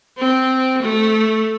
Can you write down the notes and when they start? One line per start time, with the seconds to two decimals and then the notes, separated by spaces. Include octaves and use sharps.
0.18 C4
0.82 A3